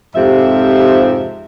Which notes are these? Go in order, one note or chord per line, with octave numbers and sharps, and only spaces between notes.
F2 G#2 C3 F3 G4 E5